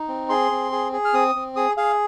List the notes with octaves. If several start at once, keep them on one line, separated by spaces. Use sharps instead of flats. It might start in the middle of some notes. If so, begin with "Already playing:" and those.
Already playing: D#4
C4
G#4 C6
C4
G#4
G#4
F6
C4 D#6
C4
G#4 D#6
G#4 F5